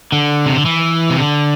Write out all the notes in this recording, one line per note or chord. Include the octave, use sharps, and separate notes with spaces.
D3
C3
D3
E3
C3
D3